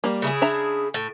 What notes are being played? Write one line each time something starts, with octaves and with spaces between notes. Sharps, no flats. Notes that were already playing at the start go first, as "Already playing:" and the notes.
G3 A#3
C#3 E4 G#4
D4 E5 A#5
A2